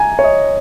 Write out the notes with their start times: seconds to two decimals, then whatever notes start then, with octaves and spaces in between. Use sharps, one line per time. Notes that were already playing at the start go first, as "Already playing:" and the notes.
Already playing: G#5 A#5
0.19 C#5
0.24 D#5